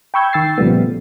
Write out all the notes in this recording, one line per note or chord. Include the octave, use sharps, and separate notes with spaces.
G5 B5 C#6 E6 G6 G#6
D#3 G5 E6 A6 C7
A#2 C#3 F3 G3 A3 B3